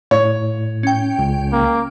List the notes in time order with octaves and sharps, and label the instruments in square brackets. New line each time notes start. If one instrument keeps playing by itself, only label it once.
[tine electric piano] A2 [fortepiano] C#5
[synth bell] C#4 G5
[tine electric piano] C#2
[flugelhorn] A#3